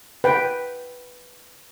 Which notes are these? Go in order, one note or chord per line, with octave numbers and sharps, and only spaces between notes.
B4 G5